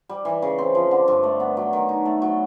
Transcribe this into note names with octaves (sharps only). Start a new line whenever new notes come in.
G3
E3
C#3
C4
F3
D3
G2
A3
B3
F#3
D#3
D#4
A3
F#3